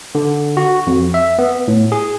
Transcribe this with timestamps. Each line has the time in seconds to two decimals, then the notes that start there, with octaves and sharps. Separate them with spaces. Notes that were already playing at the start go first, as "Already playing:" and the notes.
0.15 D3
0.57 F#4
0.87 F2
1.14 E5
1.39 B3
1.68 A2
1.92 G#4